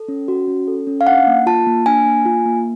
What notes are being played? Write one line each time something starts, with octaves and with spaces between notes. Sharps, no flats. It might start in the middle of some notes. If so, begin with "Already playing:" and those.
Already playing: A4
C#4
F#4
C#4
A4
C#4
F5
D4 F#5
A#3
F4 A5
A#3
D4 G#5
A#3
F4
A#3